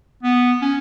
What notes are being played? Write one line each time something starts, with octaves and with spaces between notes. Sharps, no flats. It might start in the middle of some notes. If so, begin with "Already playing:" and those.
B3
C#4